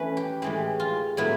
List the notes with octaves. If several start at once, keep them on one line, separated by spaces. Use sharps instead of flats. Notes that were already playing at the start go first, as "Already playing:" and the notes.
Already playing: E3 A3 C#4 B4
G4
A2 E3 G#3 G4
F4
A2 F#3 B3 E4